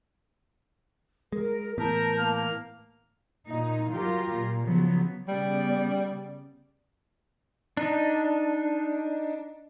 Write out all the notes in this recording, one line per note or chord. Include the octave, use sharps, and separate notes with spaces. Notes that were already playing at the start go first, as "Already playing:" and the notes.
G#3 A#4
A2 E3 B3 A#4 A5 G6
A#3 F6
A#2 D#4
F#3 F4 G4 A#4
A#2
C#3 F3 F#3 B3
C#3 G3 B3 D5
D4 D#4